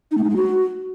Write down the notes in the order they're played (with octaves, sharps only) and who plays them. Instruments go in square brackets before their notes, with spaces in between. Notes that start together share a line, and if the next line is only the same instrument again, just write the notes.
[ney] D#4
A3
D#4
G#3
F#4